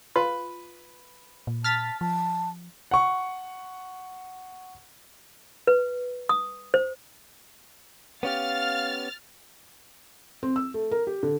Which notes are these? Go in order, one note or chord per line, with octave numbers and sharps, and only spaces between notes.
F4 B4
A#2
A5 F6 A6 B6
F3 A5
F#5 C#6
B4
D#6
C5
B3 C#4 G4 F5 F6 A6
C4
E6
A3
A#4
G4
D3